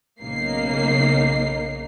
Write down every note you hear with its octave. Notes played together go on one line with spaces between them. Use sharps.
B1 C#3 A#3 D#4 C7